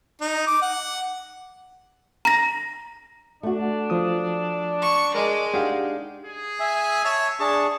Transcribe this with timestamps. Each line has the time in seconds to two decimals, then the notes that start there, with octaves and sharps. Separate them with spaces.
0.21 D#4
0.47 D6
0.62 F#5
2.25 A#5 A#6
3.43 A3 D4 F#4
3.90 F3 D#6
4.82 C#6
5.15 G#3 A#4 D5 D#5
5.54 D4 D#4 G4 G#4 F5 F#5
6.26 G#4
6.60 E5 G#5
7.05 C#5 E5 A5
7.40 D4 G#4 A5 C#6